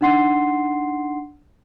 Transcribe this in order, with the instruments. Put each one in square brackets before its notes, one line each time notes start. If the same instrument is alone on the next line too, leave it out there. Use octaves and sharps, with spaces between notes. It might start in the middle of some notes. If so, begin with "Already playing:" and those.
[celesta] D4 D#4 F#5 C6 C7